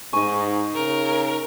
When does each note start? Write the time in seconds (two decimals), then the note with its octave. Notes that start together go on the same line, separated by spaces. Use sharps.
0.13 G#2 D#4 G#5 C#6
0.74 C#3 A#4